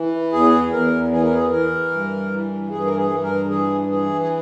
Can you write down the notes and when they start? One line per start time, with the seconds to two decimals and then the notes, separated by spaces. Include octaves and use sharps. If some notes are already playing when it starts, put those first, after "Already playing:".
Already playing: E3
0.32 E2 G#4
0.72 E2 A#4
1.12 E3 G#4
1.23 A#4
1.34 G#4
1.52 E3 A#4
1.91 G2
2.31 E3
2.71 G2 G#4
2.85 A#4
2.97 G#4
3.10 G2
3.23 A#4
3.49 E3 G#4
3.89 E3 G#4
4.22 G#4